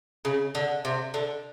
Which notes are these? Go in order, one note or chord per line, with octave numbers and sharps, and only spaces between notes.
C#3
D3
C3
D3